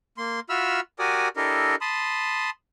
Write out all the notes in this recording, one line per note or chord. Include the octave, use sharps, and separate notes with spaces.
A#3 C6
F4 F#4 E5 B5 E6 F6
F#4 G4 A#4 D5 G#5 D#6
D4 E4 G4 A4 A#4 D#5
A5 B5 C6 D#6